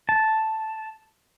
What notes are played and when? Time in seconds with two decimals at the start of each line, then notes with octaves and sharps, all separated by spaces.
0.09 A5